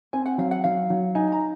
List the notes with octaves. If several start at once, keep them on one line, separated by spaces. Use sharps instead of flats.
C4 G#5
F#5
F#3 F5
F#5
F#3 F5
F#3
D#4 G#5
A#5